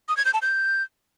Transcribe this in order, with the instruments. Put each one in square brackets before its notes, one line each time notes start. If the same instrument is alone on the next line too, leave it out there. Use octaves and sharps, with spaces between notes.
[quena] D#6
G#6
G6
A5
G6